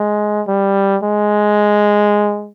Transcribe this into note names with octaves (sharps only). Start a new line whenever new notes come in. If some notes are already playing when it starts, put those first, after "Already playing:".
Already playing: G#3
G3
G#3